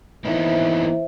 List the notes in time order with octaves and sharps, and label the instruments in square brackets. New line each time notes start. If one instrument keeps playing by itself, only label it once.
[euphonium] E3 [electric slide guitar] A#3 B3 D#4 [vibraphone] C5 E5